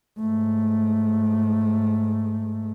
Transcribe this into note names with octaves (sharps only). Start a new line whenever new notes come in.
G#2 A3